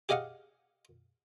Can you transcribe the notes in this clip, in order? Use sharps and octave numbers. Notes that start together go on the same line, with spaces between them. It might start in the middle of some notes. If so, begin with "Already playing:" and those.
G4 G#4 D#5 F5 F#5